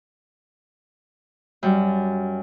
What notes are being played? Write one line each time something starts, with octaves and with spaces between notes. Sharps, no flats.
F#2 G3